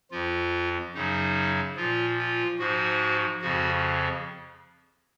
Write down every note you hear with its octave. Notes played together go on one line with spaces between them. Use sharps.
F2 F3 F4
F#2 C#3 F#3 D#4
A#2 F3 F4
F4
G#2 F3 F#4
F2 C#3 F3 F#4